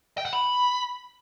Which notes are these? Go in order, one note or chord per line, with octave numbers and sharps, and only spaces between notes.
G5
F#5
B5